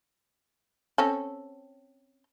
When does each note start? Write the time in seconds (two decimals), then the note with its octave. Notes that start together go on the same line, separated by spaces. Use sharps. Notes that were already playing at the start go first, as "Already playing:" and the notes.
0.98 C4 C#4 A4